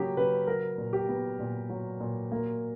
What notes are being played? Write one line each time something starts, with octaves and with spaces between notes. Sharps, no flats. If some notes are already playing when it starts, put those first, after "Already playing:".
Already playing: C#3 F#3 A#3 G4
C#3 B4
F#3 A#4
A#2
G4
B3
A#2
F#3
A#2
A#3